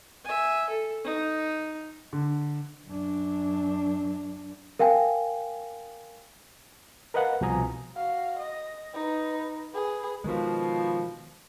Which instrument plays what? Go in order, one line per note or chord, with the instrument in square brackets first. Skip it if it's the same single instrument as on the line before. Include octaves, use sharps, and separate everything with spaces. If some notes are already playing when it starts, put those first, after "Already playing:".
[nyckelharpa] E5 G#5
A4
D#4
[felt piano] D3
[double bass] F#2 D4
[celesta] A#4 F5 G5 G#5
[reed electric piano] A#4 B4 D#5 F5 F#5
C2 B2 F3 G#5 A#5 D#6
[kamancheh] F#4 F5
D#5
D#4 B4
G#4 B4
[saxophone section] B2 F3 [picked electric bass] D#3 G#3